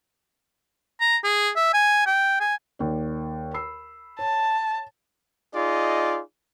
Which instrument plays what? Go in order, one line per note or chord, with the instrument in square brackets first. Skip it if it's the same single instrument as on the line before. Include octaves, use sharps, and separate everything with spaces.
[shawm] A#5
G#4
E5
G#5
G5
G#5
[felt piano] D#2 D5
B5 E6 C7
[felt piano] C#5 [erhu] A5
[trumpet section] D#4 F4 G#4 D5 D#5